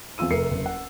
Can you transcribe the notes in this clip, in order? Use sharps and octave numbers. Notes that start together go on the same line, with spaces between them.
E2 C4 F4 E6 D#7
F1 A3 A#4 C7 C#7
F#1
F#5